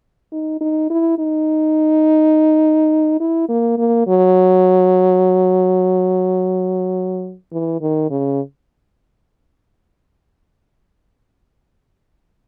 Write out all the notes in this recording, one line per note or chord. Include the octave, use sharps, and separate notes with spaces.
D#4
D#4
E4
D#4
E4
A#3
A#3
F#3
E3
D#3
C#3